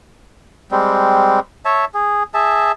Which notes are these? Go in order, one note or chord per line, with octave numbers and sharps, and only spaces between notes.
G3 G#3 C4
C#5 E5 A5
G#4
G#4 E5 A5